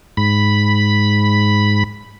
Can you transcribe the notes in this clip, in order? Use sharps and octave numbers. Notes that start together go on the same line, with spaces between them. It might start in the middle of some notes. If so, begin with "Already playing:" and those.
G#2 B5